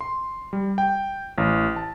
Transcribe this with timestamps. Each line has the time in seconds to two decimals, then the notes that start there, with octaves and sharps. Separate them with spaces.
0.01 C6
0.53 G3
0.78 G5
1.38 A1
1.76 A5